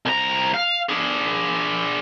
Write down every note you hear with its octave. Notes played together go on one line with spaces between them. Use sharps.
C2 A#5
F5
D4 G#4